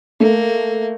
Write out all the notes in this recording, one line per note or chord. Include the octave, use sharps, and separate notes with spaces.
A3 A#3